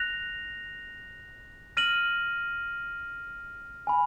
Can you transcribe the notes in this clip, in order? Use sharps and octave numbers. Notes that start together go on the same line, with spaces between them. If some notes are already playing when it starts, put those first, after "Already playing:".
Already playing: F#6 A#6 F7
F6 A#6 D#7 F#7
G#5 B5